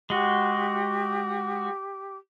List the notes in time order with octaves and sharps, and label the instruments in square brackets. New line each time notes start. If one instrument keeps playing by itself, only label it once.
[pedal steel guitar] G#3 F#4 [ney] G4